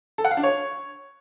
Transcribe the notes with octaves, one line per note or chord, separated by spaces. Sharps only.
A4
F#5
F5
D4
C#5